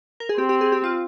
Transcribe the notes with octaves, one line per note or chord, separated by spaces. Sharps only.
A#4
G#4
C4 G4
G4
G#4
G4
F4